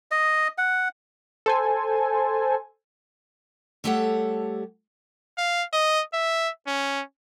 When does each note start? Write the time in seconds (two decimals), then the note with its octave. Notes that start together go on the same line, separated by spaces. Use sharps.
0.11 D#5
0.58 F#5
1.46 A4 C5 G#5
3.84 G3 A3 G4 A4 C#5 F#5
5.38 F5
5.73 D#5
6.14 E5
6.67 C#4